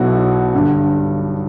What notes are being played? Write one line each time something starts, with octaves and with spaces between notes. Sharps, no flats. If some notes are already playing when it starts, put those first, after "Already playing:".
Already playing: B1 B2 E4 F#4
G1 G2 D3